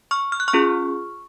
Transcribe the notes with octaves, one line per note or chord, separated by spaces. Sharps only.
C#6 F6
F6
F#6
C#6 F6
C#4 F4 G#4